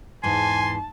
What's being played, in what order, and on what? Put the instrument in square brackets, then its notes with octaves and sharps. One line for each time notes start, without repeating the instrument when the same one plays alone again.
[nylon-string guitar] E2 G#2 E3 [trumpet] G#5 [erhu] A5 [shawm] C6